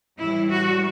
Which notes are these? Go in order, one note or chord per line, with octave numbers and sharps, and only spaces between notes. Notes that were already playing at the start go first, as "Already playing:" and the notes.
A2 E3 G3 E4
F#4